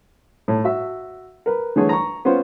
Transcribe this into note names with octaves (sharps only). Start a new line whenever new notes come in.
A2
F#4 E5
A#4 B4
D3 E3 A3 G#4 C#5
A#5 C#6
B3 C#4 F4 C5